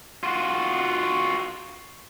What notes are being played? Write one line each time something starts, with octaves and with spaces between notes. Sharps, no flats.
F4 F#4